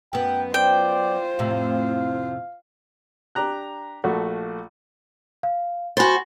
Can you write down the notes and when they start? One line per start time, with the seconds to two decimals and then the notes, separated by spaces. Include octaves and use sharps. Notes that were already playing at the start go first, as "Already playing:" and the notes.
0.13 F#2 B3 G5
0.54 F4 C5 D5 G5
1.39 F2 A2 C3 F5
3.35 D4 G4 A#5 F#6
4.04 A#1 A3 F#4
5.43 F5
5.97 F#4 C5 G#5 B5 A6